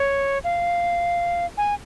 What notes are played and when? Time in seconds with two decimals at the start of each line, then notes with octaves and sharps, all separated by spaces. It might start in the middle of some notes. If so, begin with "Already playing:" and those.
Already playing: C#5
0.44 F5
1.58 G#5